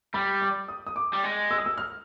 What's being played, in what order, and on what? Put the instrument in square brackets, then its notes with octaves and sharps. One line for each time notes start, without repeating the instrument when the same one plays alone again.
[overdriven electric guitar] G3 [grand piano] B5
[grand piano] D6
D#6
D#6
D6
[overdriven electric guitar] G3
G#3
[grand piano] E6
D#6
E6
F6